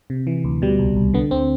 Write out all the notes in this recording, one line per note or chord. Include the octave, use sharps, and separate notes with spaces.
C3
E3
D2
B2 G3
C2
C2
D3 B3
D2 C4